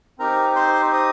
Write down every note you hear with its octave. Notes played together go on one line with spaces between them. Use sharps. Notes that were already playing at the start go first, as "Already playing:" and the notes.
C4 D#4 G4 A#4 A#5
C5 C6
D#5 D#6